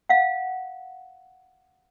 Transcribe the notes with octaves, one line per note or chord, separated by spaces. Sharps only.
F5 F#5